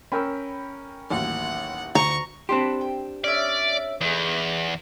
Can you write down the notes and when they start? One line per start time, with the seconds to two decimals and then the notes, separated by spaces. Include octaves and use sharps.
0.12 C#4 A#4 G5 B5 E6
1.10 A1 D#2 F#3 F#5
1.95 D2 A#5 C#6
2.49 C4 D4 G4 B4 A5 C6
2.81 G5
3.24 C#4 C#5 D5 E5
4.01 E2 D#4 G#4